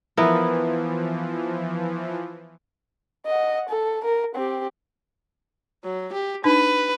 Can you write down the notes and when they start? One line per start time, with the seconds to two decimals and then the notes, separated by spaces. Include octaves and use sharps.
0.17 E3 F3 B3 E4 A#4
3.26 D#5 F#5
3.69 A4
4.04 A#4
4.35 C4 G4
5.84 F#3
6.13 G4
6.44 D4 D#4 B4